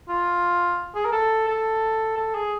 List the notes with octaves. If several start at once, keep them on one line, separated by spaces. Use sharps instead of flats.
F4
G#4
A#4
A4
A4
A4
G#4